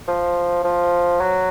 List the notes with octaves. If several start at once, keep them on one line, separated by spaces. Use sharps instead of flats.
F3
F3
F#3